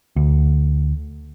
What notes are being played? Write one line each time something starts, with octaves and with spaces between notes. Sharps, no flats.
D2